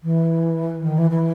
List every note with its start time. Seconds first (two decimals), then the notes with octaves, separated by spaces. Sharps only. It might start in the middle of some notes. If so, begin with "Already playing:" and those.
0.03 E3
0.83 D#3
0.98 E3
1.10 E3